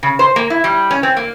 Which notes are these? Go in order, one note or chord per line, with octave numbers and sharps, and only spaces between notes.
C#3
C5
A#3
E4
G3
C#4
C4
A#3